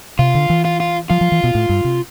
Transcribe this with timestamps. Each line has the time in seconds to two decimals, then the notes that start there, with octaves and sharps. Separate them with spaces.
0.19 C3 F4
0.35 D3
0.50 E3
0.65 F4
0.80 F4
1.10 F3 F4
1.21 F3
1.32 E3
1.44 B2
1.55 A2
1.69 G2
1.84 C3